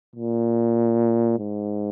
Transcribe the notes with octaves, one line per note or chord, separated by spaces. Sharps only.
A#2
G#2